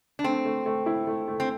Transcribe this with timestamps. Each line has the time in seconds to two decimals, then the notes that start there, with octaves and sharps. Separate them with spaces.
0.19 D4
0.24 A3 C4
0.45 A3
0.66 A3
0.86 E4
1.07 A3
1.28 A3
1.40 C4